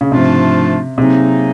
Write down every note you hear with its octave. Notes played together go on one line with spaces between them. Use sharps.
C#3
G#2 C3 F3 A3 D4 F4
C3 F#3 A#3 D#4 G#4